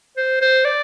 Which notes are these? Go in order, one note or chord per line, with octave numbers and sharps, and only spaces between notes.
C5
C5
D5